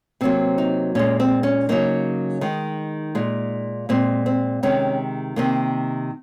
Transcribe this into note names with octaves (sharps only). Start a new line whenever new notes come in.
C3 F#3 A#3 C4
D#4
A#2 G#3 C#4
C4
C#4
C#3 F#3 A#3 D#4
D#3 G#3
A#2 G#3
A#2 G#3 C4
C4
C3 D#3 G#3 C#4
C3 D#3 A#3